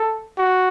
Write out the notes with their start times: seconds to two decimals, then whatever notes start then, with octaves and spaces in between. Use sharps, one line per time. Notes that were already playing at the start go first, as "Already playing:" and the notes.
Already playing: A4
0.38 F#4